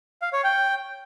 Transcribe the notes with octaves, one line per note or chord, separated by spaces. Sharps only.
F5
C#5
G5